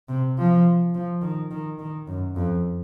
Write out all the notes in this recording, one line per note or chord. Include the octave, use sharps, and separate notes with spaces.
C3
F3
F3
D#3
D#3
D#3
F#2
F2